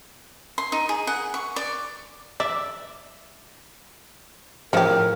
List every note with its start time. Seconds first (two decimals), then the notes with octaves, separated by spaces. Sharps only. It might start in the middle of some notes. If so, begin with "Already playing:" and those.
0.58 C6
0.72 D#4
0.89 G#4
1.07 F#5
1.34 C#6
1.56 D5
2.40 D5 E5
4.73 A2 C#3 F3 G4 A#4